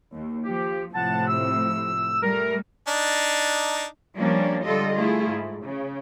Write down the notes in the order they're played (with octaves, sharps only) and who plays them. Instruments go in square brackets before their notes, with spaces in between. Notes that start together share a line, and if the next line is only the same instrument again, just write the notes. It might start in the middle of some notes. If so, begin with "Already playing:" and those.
[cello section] D#2
[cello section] F3 [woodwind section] G4
[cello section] A2 C3 F3 [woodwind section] F#5 A5
[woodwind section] E6
[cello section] G3 A3 [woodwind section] A#4
[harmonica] D4 D#4
[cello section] F3 G3 A#3 C#4 D4
D3 G3 F4 A4 D#5
A3 E4 F4 G#4
G#2
C#3